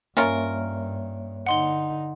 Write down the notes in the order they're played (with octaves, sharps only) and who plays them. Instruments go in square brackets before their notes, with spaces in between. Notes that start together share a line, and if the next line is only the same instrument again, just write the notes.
[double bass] G2 [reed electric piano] A#3 C#5 E5 [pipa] C#4 F4 A#4
[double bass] D3 D#4 [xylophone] F#5 C6 G7